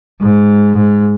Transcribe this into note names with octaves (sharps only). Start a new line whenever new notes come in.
G#2
G#2